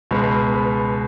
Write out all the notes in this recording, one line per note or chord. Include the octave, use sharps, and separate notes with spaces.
C#2 B2 G#3 B4
B4